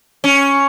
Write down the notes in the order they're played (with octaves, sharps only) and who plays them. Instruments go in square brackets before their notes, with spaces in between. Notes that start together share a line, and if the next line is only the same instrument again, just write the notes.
[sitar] C#4